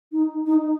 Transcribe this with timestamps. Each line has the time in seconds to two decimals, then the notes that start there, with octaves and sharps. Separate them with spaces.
0.12 D#4
0.46 D#4